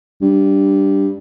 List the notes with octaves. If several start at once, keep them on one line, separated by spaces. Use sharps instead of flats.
G2